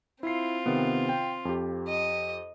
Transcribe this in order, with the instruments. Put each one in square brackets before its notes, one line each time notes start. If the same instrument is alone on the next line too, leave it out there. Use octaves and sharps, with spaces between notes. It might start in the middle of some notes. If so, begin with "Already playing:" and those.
[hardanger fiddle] C4 F4 [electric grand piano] E4 C7
[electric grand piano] C3 D#3 B3
G5
F2 G4
[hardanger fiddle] D#5